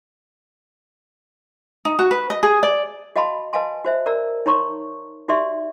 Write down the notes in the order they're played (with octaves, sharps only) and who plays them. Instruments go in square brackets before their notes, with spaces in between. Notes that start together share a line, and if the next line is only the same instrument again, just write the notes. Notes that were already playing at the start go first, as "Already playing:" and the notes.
[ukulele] D#4
F#4
B4
D#5
G#4
D5
[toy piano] F#4 D#5 F5 A5 B5 C6
B4 D#5 F5 G#5 A5 C6
F#4 C5 E5
A#4 D5 A#5 E6
D#4 C#5 A#5 C6 C#6
D#4 F#4 G4 D5 E5 C6